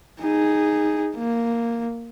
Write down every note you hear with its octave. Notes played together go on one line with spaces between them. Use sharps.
D#4 G#4
A#3